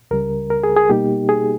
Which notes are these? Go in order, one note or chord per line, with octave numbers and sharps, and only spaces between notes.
C#2 C#3 G3 A#4
A#4
G#4
G#4
B2 G3 A#3 D#4 G4
G#4